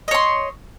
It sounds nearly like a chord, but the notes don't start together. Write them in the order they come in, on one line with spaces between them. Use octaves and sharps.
D#5 C#5 C6